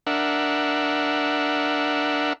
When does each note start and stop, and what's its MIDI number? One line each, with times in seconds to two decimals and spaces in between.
0.07 2.33 62
0.07 2.33 70
0.07 2.33 76
0.07 2.33 78